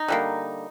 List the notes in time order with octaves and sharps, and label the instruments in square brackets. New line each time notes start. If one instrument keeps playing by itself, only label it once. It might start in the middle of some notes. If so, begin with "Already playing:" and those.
Already playing: [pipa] D#4
D3 G3 A#3